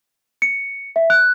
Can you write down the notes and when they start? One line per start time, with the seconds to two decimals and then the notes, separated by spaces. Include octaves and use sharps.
0.42 C#7
0.96 E5
1.10 F#6